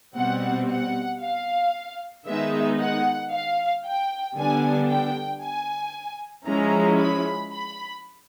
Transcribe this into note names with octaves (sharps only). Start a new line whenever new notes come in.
B2 G3 C4 F#5
F#5
F5
D#3 G#3 B3 D#4 E5
F#5
F5
G5
D3 G3 B3 D4 G#5
G5
G#5
F3 G#3 C#4 E4 A#5
B5
B5